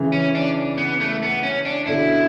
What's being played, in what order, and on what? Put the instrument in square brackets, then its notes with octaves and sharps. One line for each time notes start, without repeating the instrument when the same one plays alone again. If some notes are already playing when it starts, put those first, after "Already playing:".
Already playing: [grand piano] C#3 E3
[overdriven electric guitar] C#4
D4
B3
A3
B3
C#4
D4
[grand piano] B2 D3 [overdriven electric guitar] E4